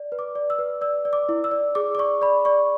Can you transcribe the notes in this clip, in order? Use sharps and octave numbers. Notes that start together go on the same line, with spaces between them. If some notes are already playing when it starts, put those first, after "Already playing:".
Already playing: D5
B4
D6
D5
E6
B4
D5 E6
D5
D6
E4
E6
D5
G#4 D6
D6
D5 C#6
D5 B5
D5 C#6